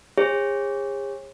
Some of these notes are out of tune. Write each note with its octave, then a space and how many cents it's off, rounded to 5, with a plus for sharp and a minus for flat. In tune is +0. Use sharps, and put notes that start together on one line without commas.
G#4 -40 C#5 -35